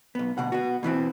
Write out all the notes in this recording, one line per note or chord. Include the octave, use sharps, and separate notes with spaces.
B1 B3
D2 B2 F#5
B3 F#4
B2 E3 B3 C4